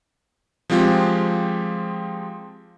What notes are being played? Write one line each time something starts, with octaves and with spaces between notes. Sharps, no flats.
F3 G#3 C4 F4 G4